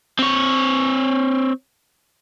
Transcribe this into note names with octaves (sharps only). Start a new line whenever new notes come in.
C4 C#5